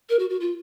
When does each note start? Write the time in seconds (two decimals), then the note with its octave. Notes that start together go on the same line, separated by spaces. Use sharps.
0.10 A#4
0.19 F#4
0.30 F#4
0.40 F4